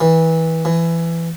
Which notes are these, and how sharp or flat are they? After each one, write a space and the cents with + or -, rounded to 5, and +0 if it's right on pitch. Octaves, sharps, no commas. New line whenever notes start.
E3 -20
E3 +20